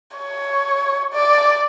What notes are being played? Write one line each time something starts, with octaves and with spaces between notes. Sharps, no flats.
C#5
D5